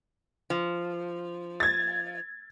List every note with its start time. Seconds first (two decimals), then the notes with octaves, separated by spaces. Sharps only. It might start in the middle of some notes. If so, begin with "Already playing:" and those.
0.50 F3
1.60 G#6 A6